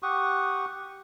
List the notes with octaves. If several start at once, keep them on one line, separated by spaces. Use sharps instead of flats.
G4 F#5 C#6 D#6